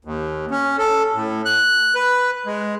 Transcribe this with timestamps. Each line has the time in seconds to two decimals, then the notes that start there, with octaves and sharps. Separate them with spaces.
0.05 D#2
0.51 C#4
0.78 A4
1.14 A2
1.46 F#6
1.95 B4
2.46 G#3